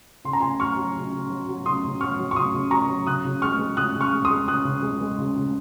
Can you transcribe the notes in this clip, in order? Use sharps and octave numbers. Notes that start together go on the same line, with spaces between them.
C#3 C6
A#5
C#3 G#5 C6
F#3 C#6 F6
F#3
C#3
C#3
F#3
F#3
C#3 C6 D#6
C#3
F#3 C#6 F6
F#3
C#6
C#3 C6 D#6
C#3
F#3 A#5 C#6
F#3
C#3 D#6 F#6
C#3
G#3 C#6 F6
G#3
C#3 D#6 F#6
C#3
C#6 F6
G#3
C6 D#6
G#3
C#3 D#6 F#6
C#3
G#3
G#3
C#3
C#3